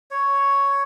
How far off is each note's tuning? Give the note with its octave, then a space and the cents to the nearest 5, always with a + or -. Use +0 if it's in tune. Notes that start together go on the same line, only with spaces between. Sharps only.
C#5 +5